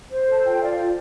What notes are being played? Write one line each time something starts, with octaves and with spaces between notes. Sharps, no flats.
C5
A4
A5
F4 G5
F4 D5 F5
F4